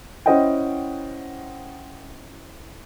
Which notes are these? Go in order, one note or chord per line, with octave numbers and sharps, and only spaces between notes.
C#4 E4 C5 D#5 F#5 G5